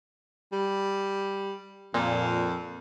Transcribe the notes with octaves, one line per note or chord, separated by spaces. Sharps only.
G3
F2 A#2